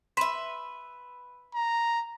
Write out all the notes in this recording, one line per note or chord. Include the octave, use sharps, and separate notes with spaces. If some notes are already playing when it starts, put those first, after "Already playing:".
B4 E5 C6 B6 E7
A#5